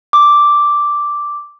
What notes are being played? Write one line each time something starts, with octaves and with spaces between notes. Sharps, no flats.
D6